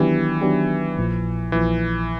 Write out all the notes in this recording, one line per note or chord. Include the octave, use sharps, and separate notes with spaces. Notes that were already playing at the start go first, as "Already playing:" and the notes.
Already playing: D#3 E3 F#3 B3 D4 G4
D#3 F#3 B3 D4 G4
A#1 A#2 F3
A#1 A#2 E3 F3